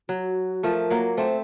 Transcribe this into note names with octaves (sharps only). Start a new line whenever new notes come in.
F#3 F#4
F3 A3 A#4
F#3 A#3
A3 C4 C5